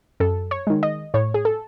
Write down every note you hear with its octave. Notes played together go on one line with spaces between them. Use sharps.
F#2 A4
C#5
D#3 G#3
D#5
A2 C#5
G#4
A4